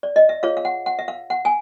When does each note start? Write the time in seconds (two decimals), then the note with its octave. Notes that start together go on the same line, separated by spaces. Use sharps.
0.03 D5
0.16 D#5
0.29 E5
0.43 F4 G#4 C#5 F5
0.57 F5
0.65 F#5
0.86 F#5
0.99 E5
1.08 F5
1.30 F#5
1.45 G#5